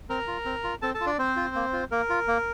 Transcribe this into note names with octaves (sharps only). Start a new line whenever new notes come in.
C4 A#4 A#5
F4
C4
F4
C4 A4 A5
A4 A5
F4
D4 D5
C4 C5
F4
A#3
F4
A#3 A#4
F4
A#3